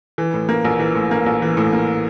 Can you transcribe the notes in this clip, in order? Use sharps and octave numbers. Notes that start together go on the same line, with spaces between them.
E3
A2
A#3
A#1
E3
A2
A#3
A#1
E3
A2
A#3